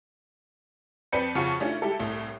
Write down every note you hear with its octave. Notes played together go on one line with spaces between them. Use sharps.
F2 C4 B4 D5 G6 C#7
F2 C#3 F4 F#4 C#6 C#7
D#3 A3 C#4 D4 E4 F4
G#3 E4 G4 A4
C2 A2 A3